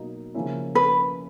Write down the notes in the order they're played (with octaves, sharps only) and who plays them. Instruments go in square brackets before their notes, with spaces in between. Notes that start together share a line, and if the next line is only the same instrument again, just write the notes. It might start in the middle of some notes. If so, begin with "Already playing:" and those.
Already playing: [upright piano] B2 F#3 A#3 D#4
C#3 F3 A#3 C#4 E4
[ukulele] B4